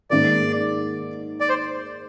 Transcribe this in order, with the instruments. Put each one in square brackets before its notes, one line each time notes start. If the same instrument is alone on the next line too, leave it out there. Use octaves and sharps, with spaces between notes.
[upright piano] G#2 D#3 A#3 [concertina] D5
[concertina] D5
C5